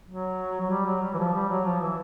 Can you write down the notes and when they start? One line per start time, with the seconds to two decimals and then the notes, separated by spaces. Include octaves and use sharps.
0.08 F#3
0.61 F#3
0.71 G3
0.86 F#3
1.02 G3
1.14 E3
1.18 F3
1.33 G3
1.49 F#3
1.65 F3
1.81 E3